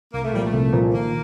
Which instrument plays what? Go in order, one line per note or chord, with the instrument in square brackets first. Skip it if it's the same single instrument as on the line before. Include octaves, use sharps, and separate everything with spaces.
[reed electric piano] C2 [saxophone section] A#3
[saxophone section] A3
[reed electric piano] A#2 F3 A#3 [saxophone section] G3
[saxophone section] A3
[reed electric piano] C2
A#2 F3 A#3
[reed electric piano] D#3 [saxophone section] A#3